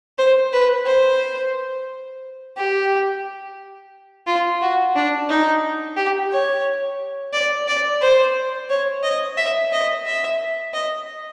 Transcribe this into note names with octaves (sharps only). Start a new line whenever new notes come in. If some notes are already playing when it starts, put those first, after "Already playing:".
C5
B4
C5
G4
F4
F#4
D4
D#4
G4
C#5
D5
D5
C5
C#5
D#5
E5
D#5
E5
D#5